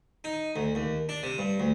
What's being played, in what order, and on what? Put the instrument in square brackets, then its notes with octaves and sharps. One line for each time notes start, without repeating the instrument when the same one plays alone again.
[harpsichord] D#4
D2
D#2
D4
C3
G2
D2